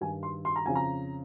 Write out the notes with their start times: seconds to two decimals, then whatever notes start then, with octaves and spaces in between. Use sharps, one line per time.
0.01 G2 D#3 G#5
0.23 C6
0.45 C6
0.56 A#5
0.66 F2 C#3 G#5
0.75 A#5